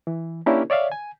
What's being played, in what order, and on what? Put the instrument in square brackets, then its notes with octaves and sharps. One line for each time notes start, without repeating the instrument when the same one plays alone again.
[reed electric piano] E3
A#3 C#4 D4 E4 G4 A#4
C#5 D5 E5 F5
G#5